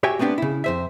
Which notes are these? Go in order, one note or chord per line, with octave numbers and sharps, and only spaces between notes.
F#4 G4 C#5 E5 G5 G#5
A3 B3 C4 D4 G4
C#3 E4
F2 C5 E5